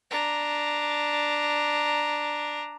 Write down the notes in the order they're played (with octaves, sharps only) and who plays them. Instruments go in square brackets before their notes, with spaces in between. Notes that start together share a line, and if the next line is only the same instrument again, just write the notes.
[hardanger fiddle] D4 A#5